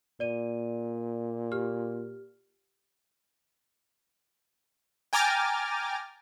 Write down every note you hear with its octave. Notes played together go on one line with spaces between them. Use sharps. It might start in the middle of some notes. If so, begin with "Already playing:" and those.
A#2 D5 D#7
G4 F6
G5 G#5 A#5 D6 F6 A6